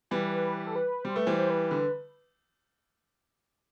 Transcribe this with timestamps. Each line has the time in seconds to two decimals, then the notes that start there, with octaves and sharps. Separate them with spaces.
0.11 E3 G3 B4
0.35 B4
0.58 B4
0.67 A4
0.76 B4
1.04 G3 C5
1.16 A3 B4
1.27 E3 G3 C5
1.39 C5
1.50 B4
1.71 D3